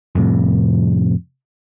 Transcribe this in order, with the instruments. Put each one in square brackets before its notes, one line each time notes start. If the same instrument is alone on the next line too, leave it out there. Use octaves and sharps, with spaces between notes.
[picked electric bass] F2 A2 C3